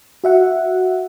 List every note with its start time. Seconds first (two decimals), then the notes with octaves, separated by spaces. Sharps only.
0.24 F#4 E5 F#5